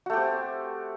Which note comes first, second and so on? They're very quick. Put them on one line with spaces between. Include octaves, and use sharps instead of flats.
F#4 A3 G4 C4